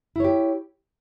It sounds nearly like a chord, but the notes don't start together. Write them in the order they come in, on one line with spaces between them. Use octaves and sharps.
E4 C#5 G4